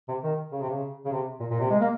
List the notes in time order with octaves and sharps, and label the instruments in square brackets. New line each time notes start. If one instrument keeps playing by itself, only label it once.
[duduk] C3
D#3
C#3
C3
C#3
C#3
C3
A#2
A#2
C3
G#3
A#3